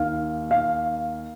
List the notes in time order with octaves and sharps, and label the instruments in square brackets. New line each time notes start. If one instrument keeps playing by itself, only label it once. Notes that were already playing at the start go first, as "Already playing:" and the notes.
Already playing: [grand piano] D#2 D#3 F5
F5